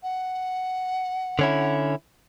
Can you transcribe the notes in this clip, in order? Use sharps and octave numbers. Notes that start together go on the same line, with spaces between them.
F#5
D3 C#4 E4